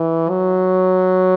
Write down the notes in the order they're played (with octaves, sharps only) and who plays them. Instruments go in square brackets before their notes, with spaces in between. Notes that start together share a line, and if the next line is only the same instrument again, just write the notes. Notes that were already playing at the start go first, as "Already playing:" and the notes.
Already playing: [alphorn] E3
F#3